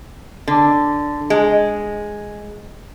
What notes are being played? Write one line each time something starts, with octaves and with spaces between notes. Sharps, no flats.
D3
G#3